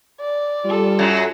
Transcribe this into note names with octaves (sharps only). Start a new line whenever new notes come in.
D5
G3 F4 A4
F#2 F#3